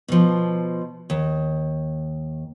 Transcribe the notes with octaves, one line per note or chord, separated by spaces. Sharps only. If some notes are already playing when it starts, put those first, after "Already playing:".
B2 F3
D#2